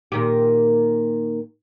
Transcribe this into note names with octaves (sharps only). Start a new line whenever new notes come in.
A#2 D#3 G4